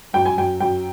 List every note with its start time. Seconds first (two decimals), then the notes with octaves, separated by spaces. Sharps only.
0.13 F#2 G5
0.25 G#5
0.37 F#2 G5
0.60 F#2 G5